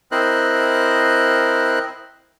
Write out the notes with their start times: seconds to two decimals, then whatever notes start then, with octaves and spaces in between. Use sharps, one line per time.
0.12 C4 E4 A#4 C5 D#5 F#6